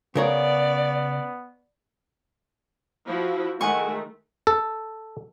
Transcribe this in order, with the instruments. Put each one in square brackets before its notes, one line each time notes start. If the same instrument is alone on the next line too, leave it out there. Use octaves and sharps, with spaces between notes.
[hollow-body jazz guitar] C#3 A#4 C#5 [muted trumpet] B3 [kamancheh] D5
[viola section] F3 E4 F#4
[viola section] D#3 G#3 A3 [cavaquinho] F#5 G#5 C#6
[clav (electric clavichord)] A4